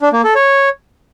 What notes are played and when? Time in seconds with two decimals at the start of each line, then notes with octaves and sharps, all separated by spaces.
0.01 D4
0.13 A#3
0.24 A4
0.35 C#5